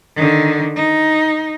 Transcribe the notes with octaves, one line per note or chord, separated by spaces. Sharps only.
D3 D#3
D#4